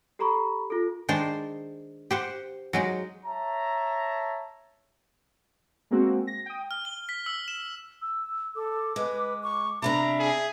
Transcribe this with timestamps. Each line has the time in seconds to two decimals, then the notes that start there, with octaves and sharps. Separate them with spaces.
0.19 G4 A4 A#5 B5 C#6
0.70 F4 A4
1.09 D#3 G#3 D4 C5
2.11 G4 C5 F#5
2.73 F#3 G#3 D#4
3.25 C#5 E5 A5 A#5
5.91 G#3 A#3 C4 F#4
6.27 A#6
6.46 G5 D#6
6.71 F6
6.85 G7
7.09 B6
7.26 E6
7.48 E7
8.02 E6
8.56 A4 D6
8.96 G#3 B4
9.43 C#6
9.82 C3 G3 D4 E5 A#5 B5
10.19 G#4